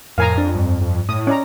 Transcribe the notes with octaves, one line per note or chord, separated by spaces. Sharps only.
F2 A2 A#4 F5 G#5 A#5
F2 D4
G2
F2
A2 D#6
C#4 D5 A#5